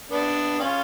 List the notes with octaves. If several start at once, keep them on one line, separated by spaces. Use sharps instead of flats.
B3 D4
C#4 F4